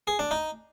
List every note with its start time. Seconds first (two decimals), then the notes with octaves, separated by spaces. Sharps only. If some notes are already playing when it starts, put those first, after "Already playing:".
0.07 G#4
0.19 D4
0.31 D#4